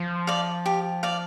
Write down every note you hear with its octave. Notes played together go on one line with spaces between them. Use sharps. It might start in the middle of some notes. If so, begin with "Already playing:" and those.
Already playing: F3
D5 F5
G4
D5 F5